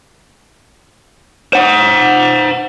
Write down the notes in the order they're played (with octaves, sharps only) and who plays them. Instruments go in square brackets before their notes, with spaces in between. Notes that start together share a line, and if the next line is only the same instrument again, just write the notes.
[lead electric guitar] C5 F#5